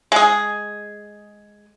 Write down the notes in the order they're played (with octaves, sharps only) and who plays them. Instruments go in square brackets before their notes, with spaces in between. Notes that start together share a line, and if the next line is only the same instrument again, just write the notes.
[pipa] G#3 G#4